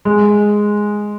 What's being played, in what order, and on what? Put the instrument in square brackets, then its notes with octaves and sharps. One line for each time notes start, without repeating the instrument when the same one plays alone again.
[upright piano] G#3